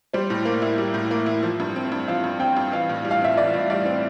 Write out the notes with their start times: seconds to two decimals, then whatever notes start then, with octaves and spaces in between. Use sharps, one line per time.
0.13 G3 C5
0.30 A2
0.45 A#3
0.62 E4
0.78 G3
0.94 A2
1.11 A#3
1.26 E4
1.43 F3
1.60 G2
1.76 C4
1.92 G2
2.08 F3 F5
2.24 G2
2.40 C4 G5
2.56 G2
2.72 E3 F5
2.89 A2
3.05 G3
3.11 F5
3.21 C4 E5
3.37 E3 D5
3.54 A2
3.70 G3 D5
3.86 C4